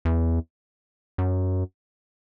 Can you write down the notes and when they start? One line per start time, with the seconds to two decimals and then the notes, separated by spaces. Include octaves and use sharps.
0.05 E2
1.18 F#2